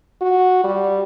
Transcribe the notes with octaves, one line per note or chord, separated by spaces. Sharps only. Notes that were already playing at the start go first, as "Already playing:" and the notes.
F#4
G3